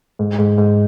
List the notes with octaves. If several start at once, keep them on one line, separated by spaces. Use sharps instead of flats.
G#2
G#2
G#2